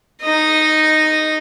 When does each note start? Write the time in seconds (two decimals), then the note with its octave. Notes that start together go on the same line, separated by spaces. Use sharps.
0.22 D#4 D#5